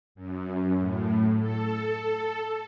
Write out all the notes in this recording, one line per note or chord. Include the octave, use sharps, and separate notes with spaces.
F#2
A2
A4